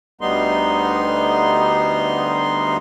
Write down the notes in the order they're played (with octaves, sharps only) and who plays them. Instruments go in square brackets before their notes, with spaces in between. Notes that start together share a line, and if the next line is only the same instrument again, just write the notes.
[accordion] D2 G3 B3 D#4 C6